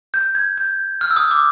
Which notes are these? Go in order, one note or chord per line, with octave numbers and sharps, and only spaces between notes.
G6
G#6
G6
F6
E6
D#6
D6